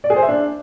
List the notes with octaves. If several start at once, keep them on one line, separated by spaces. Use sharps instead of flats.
D5
G#4
C5
E5
D4